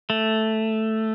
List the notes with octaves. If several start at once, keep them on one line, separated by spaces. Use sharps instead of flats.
A3